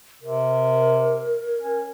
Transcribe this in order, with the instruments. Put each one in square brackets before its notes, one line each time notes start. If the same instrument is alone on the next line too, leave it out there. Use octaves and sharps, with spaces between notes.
[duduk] C3 [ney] A#4
[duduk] C#4